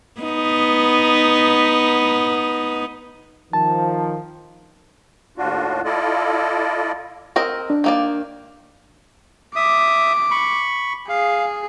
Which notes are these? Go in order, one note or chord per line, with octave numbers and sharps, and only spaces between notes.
B3 D#4
D#3 F3 A5
D#2 A2 D4 F4 F#4
E4 F4 A4 D5 D#5
C4 A#4 D#5
D4
D#3 A#3 D5
E5 D6 D#6
B5 C#6
G#4 F5